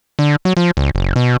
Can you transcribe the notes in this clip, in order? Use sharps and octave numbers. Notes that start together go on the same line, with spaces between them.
D3
F#3
F3
C#2
F#1
B2